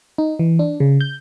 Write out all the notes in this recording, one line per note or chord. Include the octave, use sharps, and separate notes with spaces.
D#4
E3
D4
C#3
G6